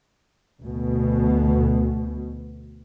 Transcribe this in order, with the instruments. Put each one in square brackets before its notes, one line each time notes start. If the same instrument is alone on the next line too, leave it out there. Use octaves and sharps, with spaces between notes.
[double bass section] D2 B2